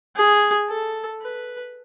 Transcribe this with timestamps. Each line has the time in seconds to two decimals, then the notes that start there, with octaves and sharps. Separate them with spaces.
0.16 G#4
0.69 A4
1.22 B4